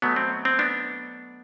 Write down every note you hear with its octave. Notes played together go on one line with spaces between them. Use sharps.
B2 F#3 A3 B3
C4
C4
B3 D4